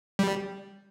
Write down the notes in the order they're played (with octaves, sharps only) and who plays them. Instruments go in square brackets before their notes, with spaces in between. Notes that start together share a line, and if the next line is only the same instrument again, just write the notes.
[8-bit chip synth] G3